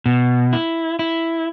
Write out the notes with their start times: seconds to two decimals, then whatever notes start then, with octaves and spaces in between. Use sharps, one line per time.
0.06 B2
0.53 E4
0.99 E4